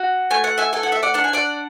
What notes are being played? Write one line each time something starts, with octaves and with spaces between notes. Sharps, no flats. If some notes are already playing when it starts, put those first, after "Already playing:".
Already playing: F#4
A3 G#5
F#5
E5 G#5
A4 G#5
F#5
E5
D5 F#5
D4 F#5
G#5
D5 F#5